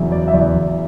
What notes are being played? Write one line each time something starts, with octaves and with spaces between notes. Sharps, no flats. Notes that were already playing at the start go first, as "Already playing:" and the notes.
Already playing: E2 C#3 F#3 E5
F#3 D5
E5
E2 D5
E2